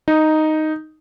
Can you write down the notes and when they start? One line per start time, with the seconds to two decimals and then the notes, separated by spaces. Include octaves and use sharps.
0.08 D#4